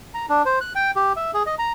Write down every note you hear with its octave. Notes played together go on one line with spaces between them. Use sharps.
A#5
D4
C5
F#6
G5
G4
E5
G#4
D#5
A#5